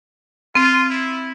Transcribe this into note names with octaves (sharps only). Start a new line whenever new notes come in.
C4 F4
E4